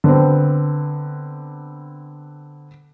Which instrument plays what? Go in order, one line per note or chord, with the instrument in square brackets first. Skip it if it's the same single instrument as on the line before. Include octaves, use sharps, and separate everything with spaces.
[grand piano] D3 B3 C4